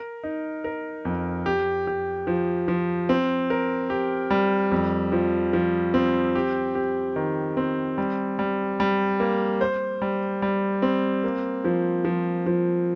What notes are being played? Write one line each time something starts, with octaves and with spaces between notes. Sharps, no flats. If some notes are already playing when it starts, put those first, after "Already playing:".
Already playing: A#4
D#4
A#4
F2
G4
G4
F3
F3
C4
A#4
G4
G3
F2
F3
F3
C4
G4
G4
D#3
C4
G3
G3
G3
A#3
C5
G3
G3
C4
A#3
F3
F3
F3